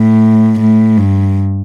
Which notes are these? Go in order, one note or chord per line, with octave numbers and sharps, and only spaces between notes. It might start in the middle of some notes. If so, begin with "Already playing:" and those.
Already playing: A2
A2
G2